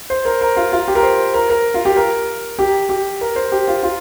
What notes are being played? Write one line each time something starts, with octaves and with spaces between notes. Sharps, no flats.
C5
A#4
A#4
F4
F4
G4
A#4
C5
A#4
A#4
F4
G4
A#4
G4
G4
A#4
C5
G4
F4
F4